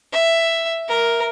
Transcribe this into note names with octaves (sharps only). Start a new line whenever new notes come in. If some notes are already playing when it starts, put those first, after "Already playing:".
E5
A#4